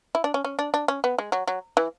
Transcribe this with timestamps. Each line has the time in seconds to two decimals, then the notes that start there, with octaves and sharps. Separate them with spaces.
0.15 E4
0.24 D4
0.34 C#4
0.45 C#4
0.59 D4
0.74 D4
0.88 C#4
1.04 B3
1.19 G#3
1.32 F#3
1.48 F#3
1.77 E3